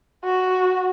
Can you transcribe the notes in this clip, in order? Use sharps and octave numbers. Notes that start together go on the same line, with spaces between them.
F#4